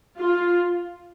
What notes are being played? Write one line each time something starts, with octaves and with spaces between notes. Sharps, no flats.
F4